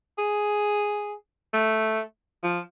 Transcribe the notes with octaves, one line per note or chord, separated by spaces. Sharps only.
G#4
A3
F3